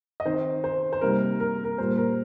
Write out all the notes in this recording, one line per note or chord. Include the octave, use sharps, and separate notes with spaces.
D#5
D#3 C4 D#4 C5
C5
C5
C3 G3 A#3 D#4 A#4
A#4
A#4
A#2 G3 A#3 C5
A#4